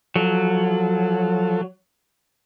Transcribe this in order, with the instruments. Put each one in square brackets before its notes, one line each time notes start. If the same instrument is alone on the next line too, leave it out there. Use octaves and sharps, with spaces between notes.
[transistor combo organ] F3 A4 [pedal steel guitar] F#3